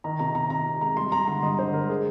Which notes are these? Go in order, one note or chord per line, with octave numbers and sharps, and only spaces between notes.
D#3 A#5
C3 A#5
C3 A#5
C3 A#5
C3
G#3 A#5
G3 C6
G3 A#5
D3 C6
G2 D#5
D3 C5
G3 A#4
G#3 G#4